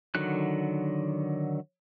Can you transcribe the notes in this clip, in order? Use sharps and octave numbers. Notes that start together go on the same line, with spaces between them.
D3 D#3 F#3 F#6